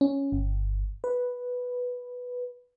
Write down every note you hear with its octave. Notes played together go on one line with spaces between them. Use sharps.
C#4
G1
B4